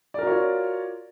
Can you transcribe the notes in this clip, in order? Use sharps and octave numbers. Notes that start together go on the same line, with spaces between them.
F4 F#4 A#4 C#5 D5